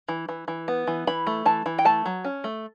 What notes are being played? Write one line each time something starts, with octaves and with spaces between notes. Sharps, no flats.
E3
E3
E3
B3
E3
E3 B5
A3
E3 A5
E3
G5
A3 A5
F#3
C#4
A3